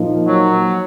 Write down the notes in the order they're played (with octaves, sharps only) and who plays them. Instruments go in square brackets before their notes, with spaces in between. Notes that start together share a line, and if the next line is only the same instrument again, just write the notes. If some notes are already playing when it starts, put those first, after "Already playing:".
Already playing: [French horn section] A#2 F3 A#3 D#4
[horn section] F#3